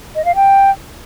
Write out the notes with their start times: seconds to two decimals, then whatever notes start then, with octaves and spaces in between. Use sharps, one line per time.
0.15 D#5
0.25 F5
0.35 G5